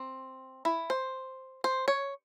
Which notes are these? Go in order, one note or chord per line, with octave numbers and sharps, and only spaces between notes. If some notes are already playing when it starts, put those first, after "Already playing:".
Already playing: C4
E4
C5
C5
C#5